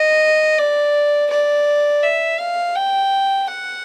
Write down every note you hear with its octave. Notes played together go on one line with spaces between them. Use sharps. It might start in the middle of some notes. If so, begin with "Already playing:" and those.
Already playing: D#5
D5
D5
E5
F5
G5
F#5